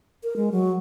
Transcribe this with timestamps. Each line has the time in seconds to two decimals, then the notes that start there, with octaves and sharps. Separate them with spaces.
0.23 A#4
0.36 G#3
0.52 F#3